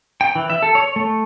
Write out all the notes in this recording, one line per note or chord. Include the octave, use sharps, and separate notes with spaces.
G5
E3
E5
A4
C#5
A3